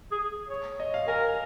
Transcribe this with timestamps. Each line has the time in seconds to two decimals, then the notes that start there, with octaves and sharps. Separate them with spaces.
0.12 G#4
0.49 C#5
0.80 D#5
0.94 F5
1.08 A#4 G#5